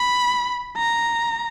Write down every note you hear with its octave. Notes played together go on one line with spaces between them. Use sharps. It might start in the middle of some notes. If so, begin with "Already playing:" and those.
Already playing: B5
A#5